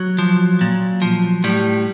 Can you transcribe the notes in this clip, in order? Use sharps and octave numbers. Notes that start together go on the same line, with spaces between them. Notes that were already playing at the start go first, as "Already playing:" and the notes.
Already playing: F#3
F3
A#2
F3
A2 G3